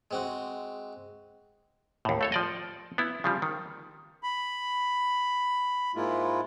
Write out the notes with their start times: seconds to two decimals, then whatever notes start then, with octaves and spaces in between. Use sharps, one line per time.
0.11 G#3 C4 F#4
2.05 D#2 A2
2.21 A3 A4 C#5
2.32 F3 D5 D#5
2.98 B3 E4
3.24 C#3 F3 G3
3.42 D#3
4.23 B5
5.95 G#2 G#3 A#3 E4 F4